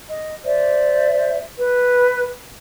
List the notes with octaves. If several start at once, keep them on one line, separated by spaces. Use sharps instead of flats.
D#5
C5 D5 E5
B4